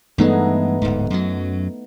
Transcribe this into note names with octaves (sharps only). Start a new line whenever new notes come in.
G2 E3 G#3 A3 B3 D#4
D1 G#2
F#2 F#3